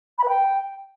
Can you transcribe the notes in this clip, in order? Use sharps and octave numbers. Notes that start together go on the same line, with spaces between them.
B5
B4
G5